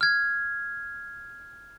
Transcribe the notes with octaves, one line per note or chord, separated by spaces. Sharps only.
F6 G#6